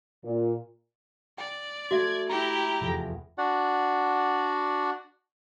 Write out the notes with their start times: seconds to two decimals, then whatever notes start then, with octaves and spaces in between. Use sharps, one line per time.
0.24 A#2
1.38 D5 G5
1.91 A3 F#4 E5 G#6
2.29 E4 G4 A#5
2.81 F1 E2
3.38 D4 F#4 D5 F#5